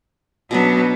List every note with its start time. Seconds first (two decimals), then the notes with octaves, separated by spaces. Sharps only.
0.51 B2 F#3 B3 C#4 D4